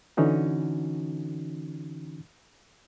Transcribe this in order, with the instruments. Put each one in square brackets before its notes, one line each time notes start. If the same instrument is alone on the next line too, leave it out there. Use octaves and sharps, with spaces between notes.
[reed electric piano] D3 E3 C#4 D#4 F#4